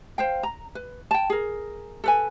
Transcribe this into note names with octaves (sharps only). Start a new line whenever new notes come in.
C5 F5 G5
A#5
B4
G5 A5
G#4 A#4
A4 B4 G#5